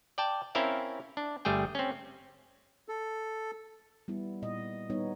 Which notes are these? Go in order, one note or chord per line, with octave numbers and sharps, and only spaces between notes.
D5 G5 A5
C4 C#4 E4 A#4 E5 F5
D4
G1 G3 A3 G#4 G5
C4 C#4
A4
G3 B3 E4
A#2 D#5
G3 B3 D#4 C#5